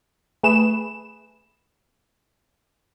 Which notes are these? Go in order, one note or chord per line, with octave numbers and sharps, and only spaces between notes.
A3 G#4 B4 E7